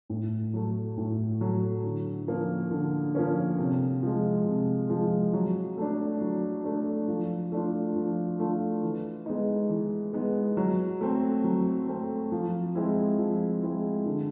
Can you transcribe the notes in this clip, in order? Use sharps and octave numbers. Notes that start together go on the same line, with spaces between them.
A2
F#3 A3
A2
F#3 A3
D3
F3 A#3 C#4
D3
F3 A#3 C#4
C3
F3 G#3
C3
F3 G#3
F#3
A3 D4
F#3
A3 D4
F3
A3 D4 F4
F3
A3 D4 F4
E3
G#3 B3 D#4
E3
G#3 B3 D#4
F#3
A3 C4
F#3
A3 C4
F3
G#3 C4 E4
F3
G#3 C4 E4
D3